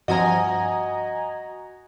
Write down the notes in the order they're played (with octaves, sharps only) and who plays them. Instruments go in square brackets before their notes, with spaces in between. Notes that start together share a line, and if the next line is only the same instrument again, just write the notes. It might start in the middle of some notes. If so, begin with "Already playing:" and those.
[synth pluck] G2 F3 C4 [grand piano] F#4 [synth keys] D#5 G#5 A#5